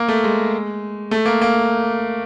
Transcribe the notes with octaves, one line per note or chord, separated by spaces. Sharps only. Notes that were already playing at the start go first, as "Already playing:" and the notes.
Already playing: A#3
A3
G#3
A3
A#3
A#3